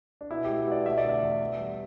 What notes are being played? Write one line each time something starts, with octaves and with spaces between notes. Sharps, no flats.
D4
B2 E4
G4
A3
B2 D5
A3 E5
D5
D3
E5
E2
B3
G3